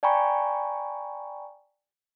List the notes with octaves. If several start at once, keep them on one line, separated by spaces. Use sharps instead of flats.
D5 G5 G#5 A#5 B5 C#6